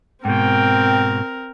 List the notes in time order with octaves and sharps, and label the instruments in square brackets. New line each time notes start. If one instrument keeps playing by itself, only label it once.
[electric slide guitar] G#2 B2 [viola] C4 A#4 [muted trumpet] G5